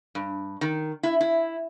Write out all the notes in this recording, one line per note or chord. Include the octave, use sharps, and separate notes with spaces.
G2
D#3
E4
E4